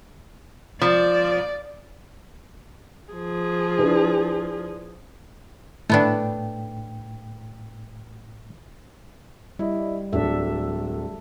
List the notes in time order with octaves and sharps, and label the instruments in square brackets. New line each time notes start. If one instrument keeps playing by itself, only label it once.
[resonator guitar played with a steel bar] F3 [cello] D5
[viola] F3 G#4
[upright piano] D4 E4 B4
[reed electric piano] A2 G5 [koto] A3 B3 D4
[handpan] G3 [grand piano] E4 D#5
[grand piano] D1 D4 [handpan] A4 E5